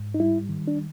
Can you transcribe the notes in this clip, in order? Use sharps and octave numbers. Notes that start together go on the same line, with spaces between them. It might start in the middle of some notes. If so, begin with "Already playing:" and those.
Already playing: G#2
D#4
G3 E4
D#3
D4